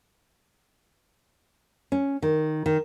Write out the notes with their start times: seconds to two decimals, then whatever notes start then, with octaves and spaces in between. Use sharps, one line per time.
1.92 C#4
2.22 D#3
2.66 D#3